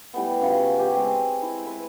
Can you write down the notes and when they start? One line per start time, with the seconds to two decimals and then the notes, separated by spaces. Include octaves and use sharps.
0.14 E3 G3 A3 B3
0.41 C#3 F3 F#4
0.77 C#4 G4 G#5
0.96 G#3 C4
1.42 E4
1.66 B4